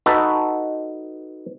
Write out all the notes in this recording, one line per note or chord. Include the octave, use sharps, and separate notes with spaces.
D#4 F#4 A4 B4